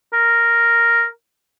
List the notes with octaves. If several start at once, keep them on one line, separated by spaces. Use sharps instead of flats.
A#4